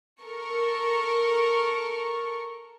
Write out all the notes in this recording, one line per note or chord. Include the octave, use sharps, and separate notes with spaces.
A4 A#4 C#6